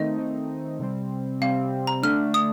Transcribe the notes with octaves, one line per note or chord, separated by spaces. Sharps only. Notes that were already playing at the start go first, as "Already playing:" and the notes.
Already playing: D#3 A3 C4 D#4 D#5
D#3 A3 C4 D#4
C3 G3 C4
C3 G3 C4 F5
A#5
D3 A3 D4 F6
D#6